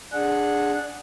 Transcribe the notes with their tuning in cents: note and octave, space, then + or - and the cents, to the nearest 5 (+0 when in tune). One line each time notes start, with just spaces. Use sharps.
D4 +0 G#4 +0 F#5 -10